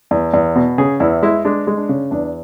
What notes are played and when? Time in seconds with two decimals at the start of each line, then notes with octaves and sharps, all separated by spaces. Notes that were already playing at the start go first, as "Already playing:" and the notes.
0.11 E2
0.33 E2
0.55 B2
0.78 C#3 G#4
1.00 E2 E4
1.23 G#3 E4
1.45 G#3 D4
1.67 G#3
1.77 D4
1.89 C#3
2.11 E2 D4